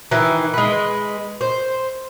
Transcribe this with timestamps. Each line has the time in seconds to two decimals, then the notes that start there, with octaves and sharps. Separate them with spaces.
0.11 D#3 E3
0.54 G#3 B4
1.41 C5